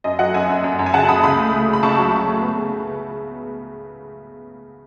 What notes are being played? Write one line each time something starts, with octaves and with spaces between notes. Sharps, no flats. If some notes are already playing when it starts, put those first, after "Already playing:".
F#2 D#5
F#3 D#5 F#5
F#2 E5 G#5
F#2
F#2
F#2
G#5
C#3 F#5 A5
F#2 B5 D#6
C#2 B5 D#6
A3
A3
C#3 B5
C#2 A5 C#6
F#3
C#2
A3
B3
C#3